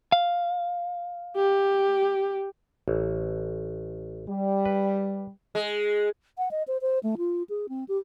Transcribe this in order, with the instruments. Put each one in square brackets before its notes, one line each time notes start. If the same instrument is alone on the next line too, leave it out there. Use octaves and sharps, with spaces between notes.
[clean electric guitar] F5
[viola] G4
[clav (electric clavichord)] A1
[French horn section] G3
[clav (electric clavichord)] B4
[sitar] G#3
[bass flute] F#5
D#5
C5
C5
A3
F4
G#4
C4
G4